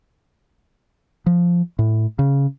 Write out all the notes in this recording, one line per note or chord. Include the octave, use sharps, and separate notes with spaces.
F3
A2
C#3